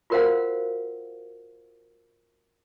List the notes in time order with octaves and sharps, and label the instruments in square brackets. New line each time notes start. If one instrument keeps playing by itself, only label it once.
[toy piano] F4 F#4 A#4 C5 F5 F#5